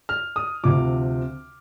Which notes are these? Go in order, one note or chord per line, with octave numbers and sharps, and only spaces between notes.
F6
D#6
D2 C3 F3 D6